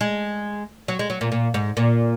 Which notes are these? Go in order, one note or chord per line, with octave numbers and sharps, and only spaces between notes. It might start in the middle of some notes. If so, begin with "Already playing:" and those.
G#3
F#3
G#3
F#3
A#2
A#2
G#2
A#2